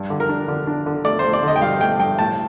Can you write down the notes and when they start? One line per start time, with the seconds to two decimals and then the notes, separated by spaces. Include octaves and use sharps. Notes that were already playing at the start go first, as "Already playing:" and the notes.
Already playing: G2
0.10 D3
0.20 A#4
0.29 D4
0.48 D3
0.67 D4
0.86 D3
1.05 A3 D5
1.19 C5
1.24 A3
1.33 D5
1.43 D3 D#5
1.56 G5
1.61 G2 F5
1.80 A3 G5
2.00 G2 G5
2.18 A2 A5